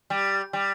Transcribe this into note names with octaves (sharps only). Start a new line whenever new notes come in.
G3
G3